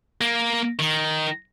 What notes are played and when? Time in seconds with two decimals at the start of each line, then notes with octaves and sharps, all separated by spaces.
0.21 A#3
0.79 D#3